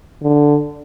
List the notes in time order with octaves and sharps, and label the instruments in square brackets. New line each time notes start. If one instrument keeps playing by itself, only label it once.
[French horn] D3